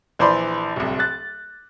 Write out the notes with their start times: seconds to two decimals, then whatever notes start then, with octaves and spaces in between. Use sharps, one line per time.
0.19 A#1 E3 C5 D5 B5 C6
0.76 D1 C2
0.99 F#6 A6